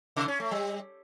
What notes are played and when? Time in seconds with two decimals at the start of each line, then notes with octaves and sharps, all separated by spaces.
0.16 C3
0.28 C#4
0.40 A3
0.51 G3